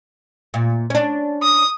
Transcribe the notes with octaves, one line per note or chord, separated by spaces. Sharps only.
A#2
C#4 D4
D#6